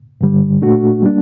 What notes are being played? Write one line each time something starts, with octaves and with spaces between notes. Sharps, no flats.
G2 D3 G3
A#2 A3 D4 F#4
G3 A#3 D4